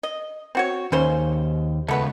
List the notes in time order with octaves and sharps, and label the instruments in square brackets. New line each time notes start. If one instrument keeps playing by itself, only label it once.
[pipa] D#5
C4 F#4 C#5
[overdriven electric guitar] D#2 [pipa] C#3 C#4 C5
[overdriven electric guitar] C#2 [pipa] A3 B3 B4